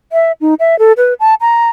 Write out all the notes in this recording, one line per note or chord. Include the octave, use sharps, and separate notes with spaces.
E5
D#4
E5
A4
B4
A5
A#5